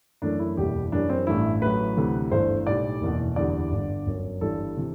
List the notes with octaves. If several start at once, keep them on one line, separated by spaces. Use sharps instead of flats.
F#2 E3 A3 D4
E4
F#1 E2 B2 G3 G4
F#2 E3 G3 D4
C4
A1 G2 E3 A3 E4
A1 A2 F#3 B4
D2 C3 E3
G1 G2 E3 A3 C5
B1 A2 G3 D5
F#1 E2 B2
F#1 E2 D3 G3 D5
G1 G2 D3
G1 F#2 F#3
G1 G2 E3 G3 A4
C3 E3